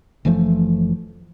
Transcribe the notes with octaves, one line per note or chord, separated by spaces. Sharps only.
F#1 E3 F3 A3